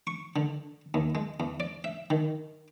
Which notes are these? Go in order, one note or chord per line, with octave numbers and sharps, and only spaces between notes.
C#6
D3
D#2
G#3
E2
D5
E5
D#3